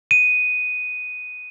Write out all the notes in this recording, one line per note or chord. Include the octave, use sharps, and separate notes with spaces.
D#7